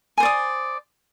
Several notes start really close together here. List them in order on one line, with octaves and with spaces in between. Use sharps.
G#5 C5 D5 D#6